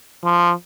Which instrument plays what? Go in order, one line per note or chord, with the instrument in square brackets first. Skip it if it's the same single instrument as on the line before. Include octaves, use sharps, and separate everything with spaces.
[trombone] F3